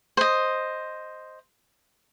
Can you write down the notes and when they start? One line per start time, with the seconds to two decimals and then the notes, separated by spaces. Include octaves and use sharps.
0.17 C5 D#5